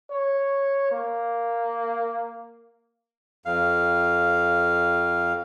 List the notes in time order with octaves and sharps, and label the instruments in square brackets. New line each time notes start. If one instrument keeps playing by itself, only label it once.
[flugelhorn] C#5
A#3
[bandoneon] F2 F5